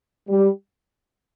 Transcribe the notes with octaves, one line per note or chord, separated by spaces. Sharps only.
G3